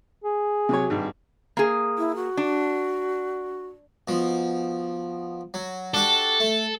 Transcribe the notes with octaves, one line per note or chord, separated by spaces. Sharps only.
G#4
C3 F#3 C#5
G#1 G2
A#3 G#4
E4
F#4
D4
B2 F3
F#3
D4 F#4 G4 A4
A3